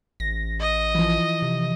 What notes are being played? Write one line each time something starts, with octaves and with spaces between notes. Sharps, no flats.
A1 A#6
D#5
E3 F3
C3